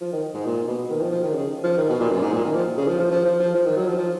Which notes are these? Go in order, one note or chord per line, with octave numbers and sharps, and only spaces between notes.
F3
D#3
G#2
A#2
B2
D#3
F3
F3
D#3
C#3
F3
D#3
B2
A#2
F#2
G#2
A#2
D#3
F3
C#3
F3
F3
F3
F3
F3
F3
D#3
F#3
F3
F3